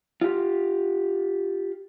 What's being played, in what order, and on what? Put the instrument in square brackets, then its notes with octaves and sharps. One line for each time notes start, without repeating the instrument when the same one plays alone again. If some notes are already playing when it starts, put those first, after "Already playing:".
[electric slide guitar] F4 G4